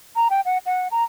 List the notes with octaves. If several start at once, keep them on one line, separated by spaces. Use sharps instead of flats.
A#5
G5
F#5
F#5
A#5